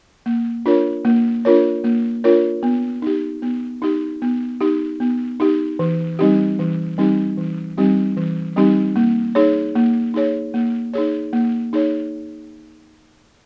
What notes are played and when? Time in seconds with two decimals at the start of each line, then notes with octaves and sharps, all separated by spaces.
0.26 A#3
0.66 D4 F4 A#4 C#5
1.05 A#3
1.45 D4 F4 A#4 C#5
1.84 A#3
2.24 D4 F4 A#4 C#5
2.63 B3
3.02 D#4 G4
3.42 B3
3.82 D#4 G4
4.22 B3
4.61 D#4 G4
5.00 B3
5.40 D#4 G4
5.79 E3
6.19 G3 C4 D#4 G4
6.59 E3
6.98 G3 C4 D#4 G4
7.38 E3
7.78 G3 C4 D#4 G4
8.17 E3
8.56 G3 C4 D#4 G4
8.96 A#3
9.35 D#4 G#4 C#5
9.75 A#3
10.14 D#4 G#4 C#5
10.54 A#3
10.94 D#4 G#4 C#5
11.33 A#3
11.73 D#4 G#4 C#5